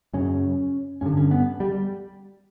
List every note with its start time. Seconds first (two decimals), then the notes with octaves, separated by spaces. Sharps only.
0.13 F#2 C#3 C#4
1.01 G2 D3 C#4
1.17 C#4
1.31 B3
1.60 G3